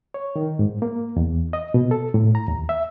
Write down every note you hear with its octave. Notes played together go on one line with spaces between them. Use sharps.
C#5
D#3
G#2
A#3
E2
D#5
B2
A4
A2
A#5
D#2
E5